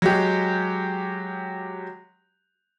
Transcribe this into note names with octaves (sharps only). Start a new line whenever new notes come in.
F#3 G#3 G4